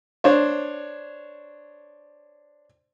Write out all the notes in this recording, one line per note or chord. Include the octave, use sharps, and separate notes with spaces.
D4 C5 C#5